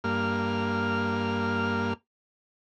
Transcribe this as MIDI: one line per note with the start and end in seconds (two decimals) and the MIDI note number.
0.04 1.93 43
0.04 1.93 58
0.04 1.93 89